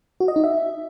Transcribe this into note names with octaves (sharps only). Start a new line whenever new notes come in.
F#4
D#5
D#4
E5